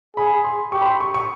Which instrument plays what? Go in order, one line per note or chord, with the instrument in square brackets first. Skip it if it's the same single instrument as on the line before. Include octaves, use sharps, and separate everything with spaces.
[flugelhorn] G#4 [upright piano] B5
[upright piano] C6
[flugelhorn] G4 [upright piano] C#6
[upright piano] B5
C6
C#6
C#6